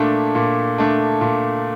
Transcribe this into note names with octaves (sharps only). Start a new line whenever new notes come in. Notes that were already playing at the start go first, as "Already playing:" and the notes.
Already playing: A#2 A3 D4
A#2
A3 D4
A#2